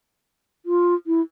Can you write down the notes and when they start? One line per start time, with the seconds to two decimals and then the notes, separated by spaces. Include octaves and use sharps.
0.66 F4
1.07 E4